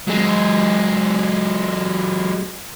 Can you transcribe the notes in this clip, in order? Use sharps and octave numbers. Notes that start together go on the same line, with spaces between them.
F#3 G#3